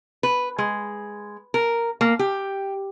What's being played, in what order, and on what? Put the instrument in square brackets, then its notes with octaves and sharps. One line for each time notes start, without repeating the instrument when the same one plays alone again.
[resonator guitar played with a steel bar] B4
G#3
A#4
A#3
G4